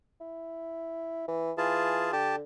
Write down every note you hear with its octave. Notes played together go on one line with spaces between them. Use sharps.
E4
E3
E3 F4 G#4 A5
D3 G4 A5